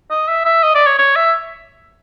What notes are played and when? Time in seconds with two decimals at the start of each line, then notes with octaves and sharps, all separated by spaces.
0.10 D#5
0.28 E5
0.45 E5
0.63 D#5
0.75 D5
0.86 C#5
0.98 C#5
1.16 E5